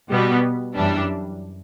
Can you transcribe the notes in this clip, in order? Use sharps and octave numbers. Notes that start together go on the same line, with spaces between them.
B2 G3 B3
F#2 E3 G3 D4